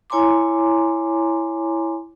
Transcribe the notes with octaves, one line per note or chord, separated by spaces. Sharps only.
E4 C#5 G#5 A#5 C6 D6